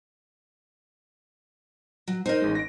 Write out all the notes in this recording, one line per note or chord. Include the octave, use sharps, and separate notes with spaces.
F#3
D#4 A#4 C5 D#5
A1 G#3
A#6 D7